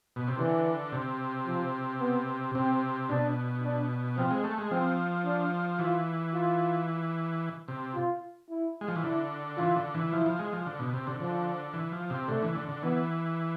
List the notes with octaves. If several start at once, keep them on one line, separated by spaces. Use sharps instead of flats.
B2
C3
D3 E3
C3
F3
B3
C3 C4
B2 D4
D4
F3 C4
G#3
A3
G#3
F3 C4
D4
E3 F4
F4
C3
F4
E4
G#3
F3
E3
D3 E4
E3 F4
D3
E3
F3 E4
F3
G#3
F3
D3
B2
C3
D3
D3 F3
E3
F3
C3
D3 A3
E3
D3
D3
E3 B3